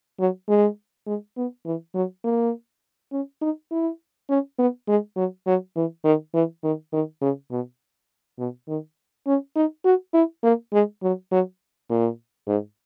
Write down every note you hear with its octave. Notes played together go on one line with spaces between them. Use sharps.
F#3
G#3
G#3
B3
E3
F#3
A#3
C#4
D#4
E4
C#4
B3
G#3
F#3
F#3
E3
D#3
E3
D#3
D#3
C#3
B2
B2
D#3
C#4
D#4
F#4
E4
A#3
G#3
F#3
F#3
A#2
G#2